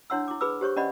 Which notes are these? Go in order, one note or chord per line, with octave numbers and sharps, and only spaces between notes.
D4 E4 C#5 F#5 C6 E6
E4 D6
G#4 B4 B5 D6 E6
G4 C5 C#5 C#6
C#4 D5 D#5 F#5 B5